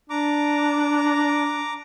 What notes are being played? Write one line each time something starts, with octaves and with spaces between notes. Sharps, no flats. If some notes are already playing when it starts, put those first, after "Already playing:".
D4 A#5 D6